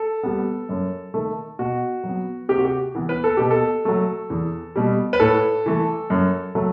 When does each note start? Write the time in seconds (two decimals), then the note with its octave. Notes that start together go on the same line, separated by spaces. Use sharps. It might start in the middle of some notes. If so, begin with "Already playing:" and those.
Already playing: A4
0.23 G3 B3
0.69 F#2
1.14 D#3 A3
1.59 B2 F#4
2.04 F#3 B3
2.49 C3 G4
2.58 F#4
2.65 G4
2.95 E3 B3
3.09 B4
3.24 A4
3.37 B2 G4
3.51 A4
3.85 F#3 A3
4.30 E2
4.76 B2 G3
5.13 B4
5.20 A2 A4
5.66 E3 A3
6.10 F#2
6.55 F#3 A3